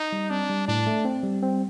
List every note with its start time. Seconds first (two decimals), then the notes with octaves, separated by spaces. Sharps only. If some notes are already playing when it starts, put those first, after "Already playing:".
Already playing: D#4
0.12 G3
0.30 C4 D4
0.49 G3
0.68 A2 D4
0.87 A3
1.05 C4
1.23 G3
1.43 C4